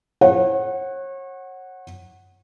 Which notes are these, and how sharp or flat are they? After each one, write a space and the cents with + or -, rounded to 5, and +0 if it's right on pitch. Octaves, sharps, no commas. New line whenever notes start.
C#5 -35 F#5 +0